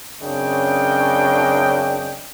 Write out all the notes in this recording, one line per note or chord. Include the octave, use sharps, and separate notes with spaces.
F#2 C#3 C4 D4 D#5 G5